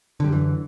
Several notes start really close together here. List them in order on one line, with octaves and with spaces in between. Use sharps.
D3 G3 F#2 E3